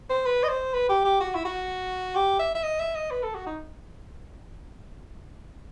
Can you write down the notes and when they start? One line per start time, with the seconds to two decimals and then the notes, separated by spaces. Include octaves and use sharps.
0.10 C5
0.26 B4
0.43 D#5
0.49 C5
0.73 B4
0.89 G4
1.05 G4
1.20 F#4
1.35 E4
1.45 F#4
2.15 G4
2.39 E5
2.55 E5
2.63 D#5
2.80 E5
2.95 D#5
3.10 B4
3.23 A4
3.34 F#4
3.46 D#4